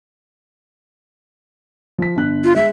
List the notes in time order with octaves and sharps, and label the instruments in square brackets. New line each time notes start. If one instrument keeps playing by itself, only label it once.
[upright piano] F3 B6
G1 D3 F#6
[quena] F4
[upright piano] G#3 [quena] E5